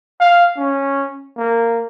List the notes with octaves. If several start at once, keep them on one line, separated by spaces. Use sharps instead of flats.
F5
C#4
A#3